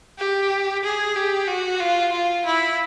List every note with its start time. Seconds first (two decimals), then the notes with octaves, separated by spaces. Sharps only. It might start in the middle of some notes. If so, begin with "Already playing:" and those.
0.18 G4
0.83 G#4
1.16 G4
1.47 F#4
1.80 F4
2.12 F4
2.46 E4